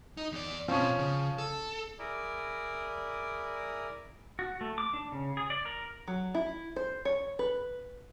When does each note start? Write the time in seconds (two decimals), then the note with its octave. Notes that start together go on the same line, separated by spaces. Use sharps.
0.17 D#4
0.32 E2 D5
0.68 B2 F3 C4 C#4
0.98 C#3
1.38 A4
1.99 E4 G#4 A#4 D5
4.39 F#4
4.61 A3
4.78 D6
4.94 D4
5.12 C#3
5.37 G#4
5.50 D5
5.65 A#4
6.08 F#3
6.35 E4
6.76 C5
7.05 C#5
7.39 B4